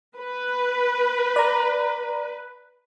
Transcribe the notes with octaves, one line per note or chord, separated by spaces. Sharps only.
B4
D5 A#5